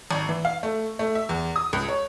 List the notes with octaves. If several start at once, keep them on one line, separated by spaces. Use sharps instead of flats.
G#1
E3
F5
A3
A3
E5
E2
D#6
C#2
C#5